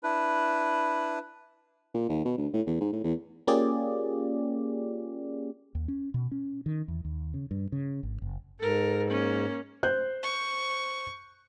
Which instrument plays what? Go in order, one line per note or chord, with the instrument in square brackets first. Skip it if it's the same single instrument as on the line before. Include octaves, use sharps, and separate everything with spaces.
[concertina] D4 E4 B4
[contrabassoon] A#2
D#2
B2
D2
A2
E2
G#2
A2
E2
[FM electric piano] A#3 C#4 F4 G4 G#4 D5
[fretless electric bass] D#2
C#4
B2
C#4
D#3
E2
D#2
C#3
G2
C#3
G#1
F#1
[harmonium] G#2 [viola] A4 A#4
[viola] A#3 C#4
[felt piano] C5 F#6 G6
[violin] C#6